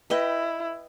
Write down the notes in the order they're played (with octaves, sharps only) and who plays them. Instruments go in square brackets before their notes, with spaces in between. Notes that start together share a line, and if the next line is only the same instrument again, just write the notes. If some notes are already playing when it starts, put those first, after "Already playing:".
[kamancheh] E4 [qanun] B4 D#5 G5